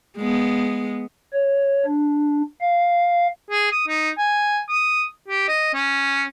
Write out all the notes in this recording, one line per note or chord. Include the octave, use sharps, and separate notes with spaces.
G#3 B3
C#5
D4
F5
G#4
D#6
D#4
G#5
D#6
G4
D#5
C#4